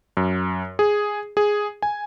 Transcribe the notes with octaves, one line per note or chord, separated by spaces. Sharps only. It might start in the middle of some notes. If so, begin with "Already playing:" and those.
F#2
G#4
G#4
G#5